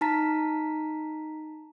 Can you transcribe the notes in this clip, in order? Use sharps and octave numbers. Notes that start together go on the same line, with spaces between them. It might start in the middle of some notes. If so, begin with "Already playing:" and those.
D#4 A5 A#5 B6